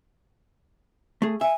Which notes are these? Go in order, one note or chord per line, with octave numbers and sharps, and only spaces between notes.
A3 G#4
E5 G#5